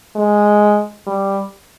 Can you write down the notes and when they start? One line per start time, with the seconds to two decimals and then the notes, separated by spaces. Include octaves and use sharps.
0.16 G#3
1.07 G3